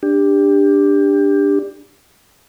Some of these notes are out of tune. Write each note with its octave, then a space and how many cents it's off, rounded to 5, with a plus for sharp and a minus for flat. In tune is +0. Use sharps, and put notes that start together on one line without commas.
D4 +0 G4 +20